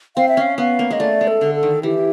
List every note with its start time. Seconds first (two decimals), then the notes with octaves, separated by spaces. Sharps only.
0.16 C4 F5
0.28 E5
0.37 C#4 F5
0.58 B3 F5
0.79 A#3
0.91 G#3 D#5
1.00 A3 D5
1.21 G#3
1.28 A4
1.41 D3
1.55 A4
1.63 D#3
1.83 E3 G4